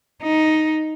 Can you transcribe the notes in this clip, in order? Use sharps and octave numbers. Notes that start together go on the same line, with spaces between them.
D#4